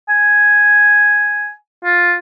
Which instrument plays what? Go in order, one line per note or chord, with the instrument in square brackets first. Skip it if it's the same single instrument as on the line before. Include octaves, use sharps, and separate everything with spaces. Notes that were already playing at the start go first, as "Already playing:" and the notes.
[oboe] G#5
F4